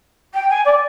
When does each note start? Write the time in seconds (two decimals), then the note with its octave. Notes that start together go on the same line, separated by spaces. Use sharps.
0.34 G5
0.49 G#5
0.65 D5